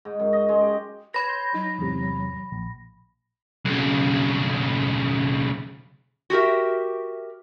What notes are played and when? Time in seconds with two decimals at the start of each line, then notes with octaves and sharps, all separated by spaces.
0.05 G#2
0.19 F#2
0.33 D#5
0.49 G#3
0.61 G4
1.14 B4 C#5 B5 A#6
1.28 C6 G6
1.54 F#3 D#4
1.79 E2 G#2 C3
2.52 A#1
3.65 B1 C#3
6.30 F#4 G4 A#4 E5